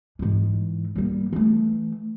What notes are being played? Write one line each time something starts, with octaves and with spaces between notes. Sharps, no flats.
G#2 E3
G3 A#3
E3 A3